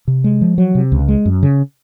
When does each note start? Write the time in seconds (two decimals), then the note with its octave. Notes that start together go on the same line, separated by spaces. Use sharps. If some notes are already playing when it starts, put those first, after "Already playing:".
0.08 C3
0.24 G#3
0.42 F3
0.58 F#3
0.75 C3
0.92 C#2
1.08 G#3
1.25 F#2
1.43 C#3